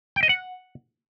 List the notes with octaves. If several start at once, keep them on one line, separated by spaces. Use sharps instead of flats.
G5
D#5
F#5